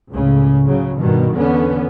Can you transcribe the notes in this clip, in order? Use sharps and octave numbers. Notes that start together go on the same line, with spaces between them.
C#2 A2 C#3
C#3 F#3
G2 B2 D#3
E2 D3 B3 C#4